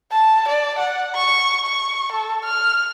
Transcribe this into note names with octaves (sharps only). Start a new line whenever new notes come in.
A5
D5
F#5
C#6
C#6
A4
F6